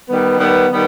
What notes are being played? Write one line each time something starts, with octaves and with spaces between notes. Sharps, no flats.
D#3 G3 B3
D#3 G3 B3
D#3 G3 B3